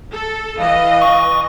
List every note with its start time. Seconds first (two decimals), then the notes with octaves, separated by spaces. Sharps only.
0.12 A4
0.58 E3 D#5 F5
1.02 C#6